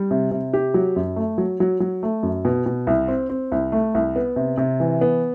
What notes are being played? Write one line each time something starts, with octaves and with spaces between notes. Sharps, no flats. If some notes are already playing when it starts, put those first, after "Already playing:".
Already playing: G3
C3
C3
G4
F#3
F#2
A3
F#3
F#3
F#3
A3
F#2
B2
B2
C2
C4
C4
C2
A3
C2
B3
C3
C3
E3
B3